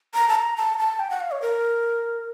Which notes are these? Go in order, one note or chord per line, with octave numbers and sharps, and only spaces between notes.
A#5
A5
A#5
A5
A#5
A5
G5
F#5
F5
C#5
A#4